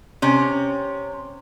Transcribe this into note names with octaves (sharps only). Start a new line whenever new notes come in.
C3 C#4